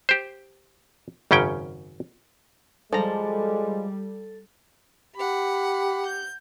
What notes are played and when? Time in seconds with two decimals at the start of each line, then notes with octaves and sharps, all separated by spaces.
0.09 G4 C5
1.31 G#1 F#2 C#3 C#4 G5
2.93 F3 G3 G#3 A4 A#5
5.16 G4 F#5 B5
6.06 G6